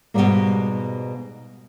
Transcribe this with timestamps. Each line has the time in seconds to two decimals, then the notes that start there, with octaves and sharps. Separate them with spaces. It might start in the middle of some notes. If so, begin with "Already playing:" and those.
0.14 G#2 B2 D3 F#3 G3 A#3